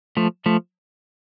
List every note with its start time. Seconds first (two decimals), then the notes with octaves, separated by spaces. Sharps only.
0.17 F3 A3
0.46 F3 A3